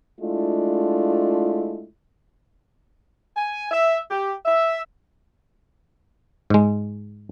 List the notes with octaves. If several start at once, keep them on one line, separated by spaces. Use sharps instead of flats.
G#3 A3 D4 E4 F4
G#5
E5
G4
E5
G#2 G#3